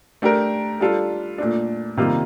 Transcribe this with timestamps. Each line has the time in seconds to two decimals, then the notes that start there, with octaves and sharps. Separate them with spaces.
0.22 A3 D4 G4 A#4
0.80 G3 D4 F4 A4
1.38 A#2 A3 D4
1.97 C3 D#3 G3 A#3 F4